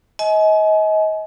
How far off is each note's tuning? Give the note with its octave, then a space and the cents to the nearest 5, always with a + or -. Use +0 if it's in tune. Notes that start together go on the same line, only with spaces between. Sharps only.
D#5 +30 G#5 +35